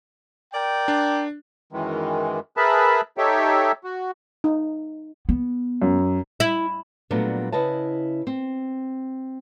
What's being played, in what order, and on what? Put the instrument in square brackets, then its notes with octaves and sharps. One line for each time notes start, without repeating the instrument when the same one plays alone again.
[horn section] A#4 D5 G5
[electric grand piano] D4
[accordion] F#2 D#3 E3 G#3
G#4 A#4 B4 E5 A5 B5
D#4 G4 A4 C#5 E5 G5
F#4
[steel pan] D#4
[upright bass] B3
[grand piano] F#2
[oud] E4
[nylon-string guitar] A#2 F#3 G3 A3 B3 D4
C#3 E4 B4 D#5 A5
C4